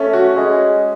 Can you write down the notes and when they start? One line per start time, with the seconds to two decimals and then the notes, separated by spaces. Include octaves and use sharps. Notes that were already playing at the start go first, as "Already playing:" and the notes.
Already playing: A3 C#4
0.13 F#4
0.36 G#3 C#4